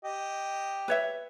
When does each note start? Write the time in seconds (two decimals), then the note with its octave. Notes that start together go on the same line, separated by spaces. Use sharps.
0.05 G4 D#5
0.88 B4 C#5 E5